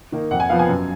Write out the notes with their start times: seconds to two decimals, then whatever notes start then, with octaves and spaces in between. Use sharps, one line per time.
0.12 D#3 A#3 D#4
0.31 F2 F#5
0.40 G#5
0.50 F3 B3 F5
0.59 G#5
0.69 F#2